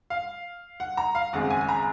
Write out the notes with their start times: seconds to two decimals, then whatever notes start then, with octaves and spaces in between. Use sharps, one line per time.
0.10 F5
0.80 F#5
0.97 A#5
1.15 F5
1.33 G#1 F#2 C#3 G#3 C4 F#5
1.50 G#5
1.61 G#5
1.69 A#5